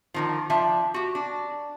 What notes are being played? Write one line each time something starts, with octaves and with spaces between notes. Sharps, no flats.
D3 D#3 F3
F3 D4 E5
F#4 G4
D4